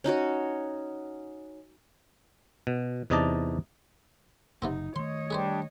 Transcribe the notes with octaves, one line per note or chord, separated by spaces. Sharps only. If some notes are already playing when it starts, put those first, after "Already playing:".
C#4 D#4 F#4 C#5
B2
E2 C3 D#4 D5 D#5 A5
F#1 C3 B3 C4 D#4
D#3 A3 C#5 D#5 C6
G3 D4 G#4 B4 C5